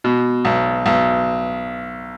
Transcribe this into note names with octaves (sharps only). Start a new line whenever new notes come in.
B2
B1
B1